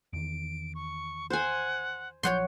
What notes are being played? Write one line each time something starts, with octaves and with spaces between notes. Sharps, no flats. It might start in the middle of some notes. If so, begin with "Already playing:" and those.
E2 D#3 D7
C#6
C5 F#5 G#5
A#1 F3 F#3 C#5 F#5 C6 G6